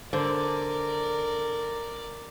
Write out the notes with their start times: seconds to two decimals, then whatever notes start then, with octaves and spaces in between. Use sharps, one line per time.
0.13 D3 A#4 C5 D5